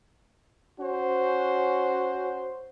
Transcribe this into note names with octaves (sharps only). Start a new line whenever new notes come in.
C#4 F#4 C5